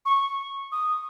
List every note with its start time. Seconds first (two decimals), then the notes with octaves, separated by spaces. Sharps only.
0.05 C#6
0.72 D#6